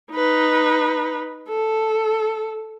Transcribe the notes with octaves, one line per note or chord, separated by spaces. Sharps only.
D#4 B4
A4